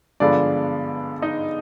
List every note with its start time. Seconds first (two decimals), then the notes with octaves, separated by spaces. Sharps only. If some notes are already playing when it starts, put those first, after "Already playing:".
0.20 G2 D3 F3 G#3 B3 D4 D5
1.22 D#4 D#5